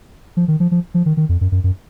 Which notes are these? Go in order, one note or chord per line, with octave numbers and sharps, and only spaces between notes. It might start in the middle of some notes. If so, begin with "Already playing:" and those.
F3
D#3
F3
F3
F3
D#3
D#3
F2
F#2
F#2
F#2